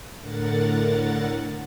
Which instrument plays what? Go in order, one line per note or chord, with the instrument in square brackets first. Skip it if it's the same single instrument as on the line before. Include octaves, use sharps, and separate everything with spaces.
[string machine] A2 D3 A#4 F#5 A6